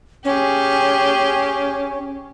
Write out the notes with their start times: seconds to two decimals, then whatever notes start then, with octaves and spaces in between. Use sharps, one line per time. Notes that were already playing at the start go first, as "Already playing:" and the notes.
0.25 C#4 G4 G#4